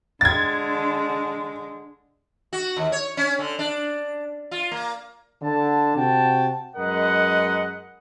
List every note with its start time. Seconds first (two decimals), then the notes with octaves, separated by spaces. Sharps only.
0.21 D3 G#3 G#6 A6
2.53 F#4
2.77 D#2
2.92 C#5
3.17 C#4
3.39 D3
3.59 D4
4.51 F4
4.71 A#3
5.42 D3 A5
5.96 C3 F#4 G5 A5
6.76 F#2 G#3 A#4 B4 D#5 F#5